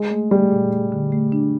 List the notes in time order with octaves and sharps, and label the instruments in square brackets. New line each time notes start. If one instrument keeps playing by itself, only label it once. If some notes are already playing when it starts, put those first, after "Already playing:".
Already playing: [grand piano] G#3
[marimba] A3
[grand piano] G3 [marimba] A3
[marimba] A#2
A3
D3
A3
D4